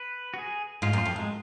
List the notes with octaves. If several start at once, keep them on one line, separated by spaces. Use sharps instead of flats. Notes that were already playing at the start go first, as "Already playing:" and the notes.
Already playing: B4
F#4
G#4
G#2 F4
F#2
F4
F2
F#2 G#3